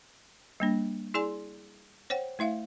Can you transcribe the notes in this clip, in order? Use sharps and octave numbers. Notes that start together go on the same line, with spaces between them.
G3 A#3 D4
E4 G#4 D5 G#5 C6
C5 C#5 F#5 G5
A3 E4 E5 F5